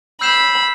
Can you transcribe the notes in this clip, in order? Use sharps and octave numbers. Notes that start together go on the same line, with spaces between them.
B5 E6 G6 C7 E7